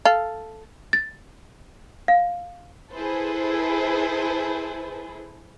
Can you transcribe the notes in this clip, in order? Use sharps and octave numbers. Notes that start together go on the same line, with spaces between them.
A4 F5
A6
F5
E4 G#4 A4 B4 C5